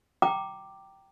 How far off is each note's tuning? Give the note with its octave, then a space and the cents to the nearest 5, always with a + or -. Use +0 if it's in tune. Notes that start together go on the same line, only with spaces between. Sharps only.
G5 -10 A#5 -5 D6 +10